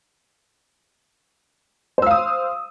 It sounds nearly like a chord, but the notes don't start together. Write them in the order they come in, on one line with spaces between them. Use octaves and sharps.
C5 E6 F5 D#6